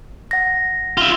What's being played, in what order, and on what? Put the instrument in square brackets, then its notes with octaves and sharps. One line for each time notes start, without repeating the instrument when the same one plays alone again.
[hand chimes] F#5 A#6
[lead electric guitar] F4 E5